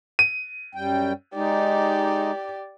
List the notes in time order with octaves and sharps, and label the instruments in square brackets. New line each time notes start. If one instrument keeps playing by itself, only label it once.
[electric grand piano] D#7
[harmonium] F#2 G3 G5
[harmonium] G#3 D#4 [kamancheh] G4 D5